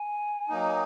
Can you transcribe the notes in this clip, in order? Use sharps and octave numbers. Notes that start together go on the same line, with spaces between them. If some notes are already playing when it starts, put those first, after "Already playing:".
Already playing: G#5
F#3 A#3 D#4